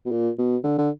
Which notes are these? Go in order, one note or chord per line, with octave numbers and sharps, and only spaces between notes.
B2
A#2
B2
D3
D3